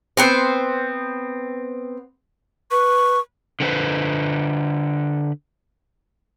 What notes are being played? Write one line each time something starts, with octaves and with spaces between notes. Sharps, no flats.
B3 C4 C5
B4 C#6
D3 A#3 C4 B4 C5